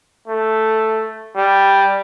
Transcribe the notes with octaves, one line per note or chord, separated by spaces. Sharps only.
A3
G3